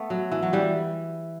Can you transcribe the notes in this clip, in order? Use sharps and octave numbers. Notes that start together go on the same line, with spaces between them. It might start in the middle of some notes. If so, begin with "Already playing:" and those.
Already playing: A3 B3
F#3
E3
F#3
E3 G3